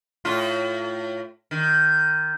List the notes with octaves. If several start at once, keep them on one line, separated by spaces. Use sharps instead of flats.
A2 F4
D#3